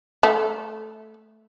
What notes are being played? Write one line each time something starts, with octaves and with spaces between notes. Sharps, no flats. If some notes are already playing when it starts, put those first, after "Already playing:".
A3